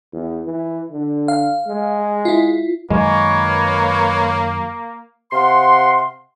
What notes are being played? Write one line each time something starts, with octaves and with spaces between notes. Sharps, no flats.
E2
E3
D3
F5
G#3
E4 F4
F#2 D#3 F#3 G#3 A#3 A#4 B4 C#5
C3 F5 F#5 C6